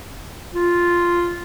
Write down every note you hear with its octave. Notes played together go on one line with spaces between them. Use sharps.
F4